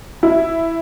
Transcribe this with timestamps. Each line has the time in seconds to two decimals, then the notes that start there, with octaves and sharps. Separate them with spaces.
0.23 E4